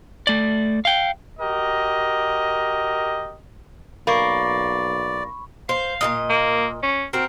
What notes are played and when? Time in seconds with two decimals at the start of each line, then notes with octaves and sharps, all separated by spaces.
0.27 A3 D5
0.85 F5 G5
1.40 F#4 G4 A#4 D#5
4.07 B1 A#3 D5 B5 C#6
5.69 C5 F5
6.01 A#2 D#3 D#5
6.30 A#3
6.83 C#4
7.13 C4 F#4 A#4